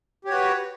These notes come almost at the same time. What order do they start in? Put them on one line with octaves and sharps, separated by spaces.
G4 C#5 F#4 B4